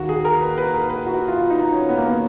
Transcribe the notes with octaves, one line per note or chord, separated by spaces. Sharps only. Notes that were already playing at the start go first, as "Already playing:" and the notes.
Already playing: D#2 D#3 A#3 F#4
G#4
A#4
B4
B4
A#4
B4
F#4
F4
D#4
C#4
B3
A#3
B3